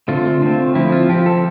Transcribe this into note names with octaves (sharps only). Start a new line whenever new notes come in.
D3 A3 C4 F4
D3 A3 C4
F3 C4 E4
F4
F3 C4 G4
A4